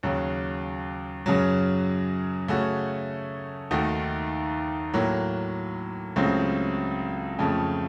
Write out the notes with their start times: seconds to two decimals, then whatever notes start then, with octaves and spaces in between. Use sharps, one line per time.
0.03 D#2 C#3 F#3
1.26 F#2 C#3 F#3
2.48 C#3 A3 C#4 F#4
3.71 D#2 D#3 A3 D#4 F#4
4.94 A2 F#3 A#3
6.16 C#2 C#3 F#3 A3 C4
7.39 F2 C#3 A3